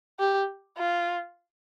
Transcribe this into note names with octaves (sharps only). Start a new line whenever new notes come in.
G4
F4